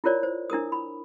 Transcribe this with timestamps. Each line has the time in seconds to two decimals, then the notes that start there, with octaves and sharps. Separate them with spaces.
0.04 E4 F4 A#4 C#5 D5
0.23 C5
0.50 D4 E4 A#4 D#6
0.72 B5